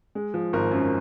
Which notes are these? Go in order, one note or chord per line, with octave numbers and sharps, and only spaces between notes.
G#3
F3
G#1 A#4
F#2